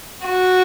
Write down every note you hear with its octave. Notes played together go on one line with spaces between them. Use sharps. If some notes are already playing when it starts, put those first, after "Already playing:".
F#4